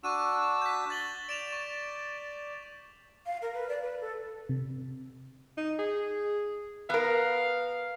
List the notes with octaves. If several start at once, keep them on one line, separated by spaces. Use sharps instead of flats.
D4 F#4 C#6 E6 D#7 E7
G6 B6
A6 F#7 G7
D5 D7 E7 F7
C#6
F5
A#4
B4
D5
B4
A4
C3
D#4
G#4
B3 A#4 F5